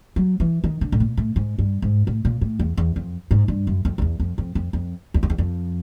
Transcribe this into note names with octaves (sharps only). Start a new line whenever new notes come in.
F#3
E3
D#3
D3
A2
A#2
A2
G#2
G2
G#2
A2
A#2
A2
E2
E2
F2
G#2
G2
F#2
F2
F2
E2
F2
F2
F2
F2
E2
F2
E2
F2